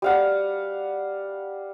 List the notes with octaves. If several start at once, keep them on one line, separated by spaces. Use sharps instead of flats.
G3 F5 F#5